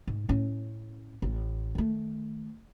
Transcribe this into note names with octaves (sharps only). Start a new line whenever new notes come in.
G#2
A2 C#4
A1
D#3 A3